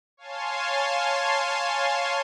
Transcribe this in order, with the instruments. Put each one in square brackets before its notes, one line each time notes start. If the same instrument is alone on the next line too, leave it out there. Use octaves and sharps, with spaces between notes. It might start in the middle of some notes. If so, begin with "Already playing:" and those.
[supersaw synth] C#5 F5 G#5 A5 C6